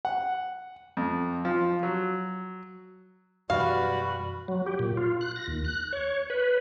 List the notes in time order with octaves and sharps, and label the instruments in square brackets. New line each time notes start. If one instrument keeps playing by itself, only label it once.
[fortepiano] F#5
F2
F3
F#3
[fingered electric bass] F#2 B2 E3 [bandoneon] G3 F#4 [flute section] B4 B5 [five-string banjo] F5
[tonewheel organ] F#3
G4
A#2
F4
F#6
A#6
D#2
F#6
C#5
B4